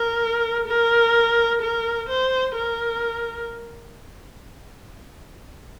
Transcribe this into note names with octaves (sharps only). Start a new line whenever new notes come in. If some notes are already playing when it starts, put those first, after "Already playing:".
Already playing: A#4
A#4
A#4
C5
A#4